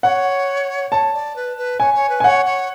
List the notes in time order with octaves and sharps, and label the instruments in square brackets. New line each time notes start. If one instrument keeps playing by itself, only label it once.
[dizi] C#5 [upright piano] F#5
[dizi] C#5 [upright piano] A5
[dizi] D5
B4
B4
[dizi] C#5 [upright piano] G#5
[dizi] C#5
B4
[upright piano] G#5
[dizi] C#5 [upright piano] F#5
[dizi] C#5